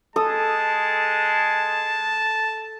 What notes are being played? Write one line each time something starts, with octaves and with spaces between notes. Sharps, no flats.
G#3 A4 A5 D#6